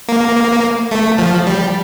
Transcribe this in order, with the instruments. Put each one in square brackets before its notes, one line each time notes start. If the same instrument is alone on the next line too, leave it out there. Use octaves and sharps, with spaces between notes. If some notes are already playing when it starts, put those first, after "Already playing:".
[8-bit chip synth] A#3
A3
F3
G3